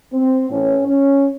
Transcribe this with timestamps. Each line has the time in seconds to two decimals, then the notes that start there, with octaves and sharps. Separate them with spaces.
0.12 C4
0.49 A2 E3 C#4
0.86 C#4